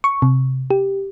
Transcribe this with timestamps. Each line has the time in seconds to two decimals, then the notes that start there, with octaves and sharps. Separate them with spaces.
0.04 C#6
0.22 C3
0.71 G4